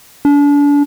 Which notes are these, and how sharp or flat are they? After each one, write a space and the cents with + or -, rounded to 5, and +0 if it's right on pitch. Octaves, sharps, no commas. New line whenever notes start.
D4 -35